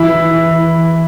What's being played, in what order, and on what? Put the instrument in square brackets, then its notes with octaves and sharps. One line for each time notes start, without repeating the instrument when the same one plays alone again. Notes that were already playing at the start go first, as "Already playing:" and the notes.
Already playing: [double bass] E3 [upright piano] E4